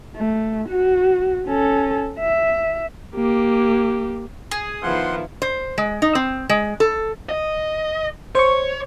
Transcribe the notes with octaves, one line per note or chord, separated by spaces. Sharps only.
A3
F#4
C#4 A4
E5
A#3 G4
G#4 D#6
D#3 F3 B3 E4 F#5 C6
C5
G#3
D#4
C4
G#3
A4
D#5
C5 C#5 C#6